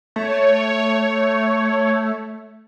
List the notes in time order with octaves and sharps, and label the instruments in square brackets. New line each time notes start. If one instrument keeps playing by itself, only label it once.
[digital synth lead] A3 [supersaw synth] C#5